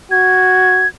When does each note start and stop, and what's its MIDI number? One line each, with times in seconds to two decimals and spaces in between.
0.11 0.86 66
0.11 0.88 92